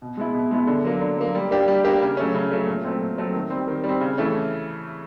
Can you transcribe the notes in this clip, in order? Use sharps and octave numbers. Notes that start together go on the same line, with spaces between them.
B2
G#3 B3 E4
B2
G#3 B3 E4
D3
F#3 A#3
D3
F#3 A#3
G3
A#3 D4 G4
G3
A#3 D4 G4
C#3
F#3 A3 C#4
C#3
F#3 A3 C#4
A#2
F#3 A3 C4
A#2
F#3 A3 C4
D#3
G3 C4
D#3
G3
C4
C#3
E3 A3 C#4